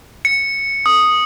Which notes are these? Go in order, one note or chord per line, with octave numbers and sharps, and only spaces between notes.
C#7
D#6